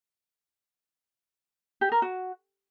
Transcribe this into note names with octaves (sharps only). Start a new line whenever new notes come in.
G4
A#4
F#4